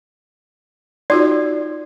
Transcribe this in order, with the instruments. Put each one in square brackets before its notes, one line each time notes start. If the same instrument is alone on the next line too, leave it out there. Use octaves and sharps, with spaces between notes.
[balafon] D#4 F4 F#4 [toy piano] D5